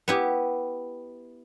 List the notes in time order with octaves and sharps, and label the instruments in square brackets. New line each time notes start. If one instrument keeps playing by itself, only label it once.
[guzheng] B3 E4 G4